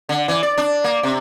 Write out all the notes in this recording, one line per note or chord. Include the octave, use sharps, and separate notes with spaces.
D3
E3
D5
D4
A#3
C3